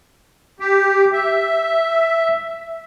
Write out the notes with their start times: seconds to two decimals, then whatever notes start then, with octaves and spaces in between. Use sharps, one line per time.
0.60 G4
1.13 E5